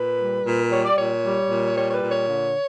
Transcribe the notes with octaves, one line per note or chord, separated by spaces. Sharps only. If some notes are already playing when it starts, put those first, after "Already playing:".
Already playing: A#2 B4
G3
A#2
G3 C#5
D5
A#2 C#5
G3
A#2
G3 C#5
C#5
B4
A#2
C#5
D3